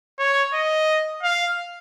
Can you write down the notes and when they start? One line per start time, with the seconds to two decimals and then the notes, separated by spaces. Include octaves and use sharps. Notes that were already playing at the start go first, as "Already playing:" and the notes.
0.19 C#5
0.54 D#5
1.23 F5